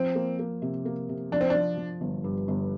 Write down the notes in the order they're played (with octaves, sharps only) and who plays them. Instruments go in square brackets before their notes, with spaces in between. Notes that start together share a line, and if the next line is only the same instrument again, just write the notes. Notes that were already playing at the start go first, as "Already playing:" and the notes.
Already playing: [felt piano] F3 [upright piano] C4
[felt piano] A#3
A#3
C3
A#3
C3
[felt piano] F3 [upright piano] D4
[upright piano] C4
[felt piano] F3 [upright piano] D4
[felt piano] F3
G1
G2
G1